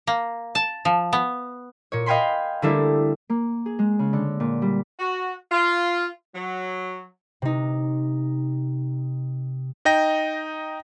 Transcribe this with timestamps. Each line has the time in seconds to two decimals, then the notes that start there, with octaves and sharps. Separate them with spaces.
0.07 A#3
0.55 A5
0.85 F3
1.13 B3
1.92 A#2 C#5
2.06 D#5 F5 G5 G#5 B5 C6
2.62 D3 G3 A3 A#3 D4 E4
3.30 A#3
3.66 G#4
3.79 G#3
3.99 C#3
4.13 D3
4.40 A#2
4.62 G3
4.99 F#4
5.50 F4
6.34 F#3
7.42 C3 D#4
9.85 D#4 D#5 G5 A#6